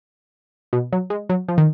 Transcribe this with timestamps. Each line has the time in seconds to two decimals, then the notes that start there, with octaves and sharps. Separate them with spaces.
0.73 B2
0.93 F#3
1.10 G#3
1.29 F#3
1.48 F3
1.58 D#3